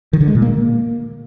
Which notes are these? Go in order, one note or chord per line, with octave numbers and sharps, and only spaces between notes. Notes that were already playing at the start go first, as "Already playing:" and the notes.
D#3
D3
G#3
A#2
A#3